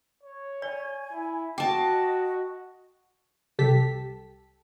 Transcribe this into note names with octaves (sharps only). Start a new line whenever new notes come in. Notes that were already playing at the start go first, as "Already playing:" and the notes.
C#5
D5 G#5
E4
F#4 D#5 G5 A5 D6
C2 G4 A4 A5 B6